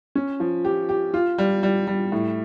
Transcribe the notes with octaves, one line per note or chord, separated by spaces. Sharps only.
C#4
F3
G4
G4
F4
G3
G3
G3
A2